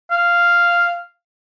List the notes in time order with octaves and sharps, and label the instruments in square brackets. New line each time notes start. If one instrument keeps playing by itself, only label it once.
[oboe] F5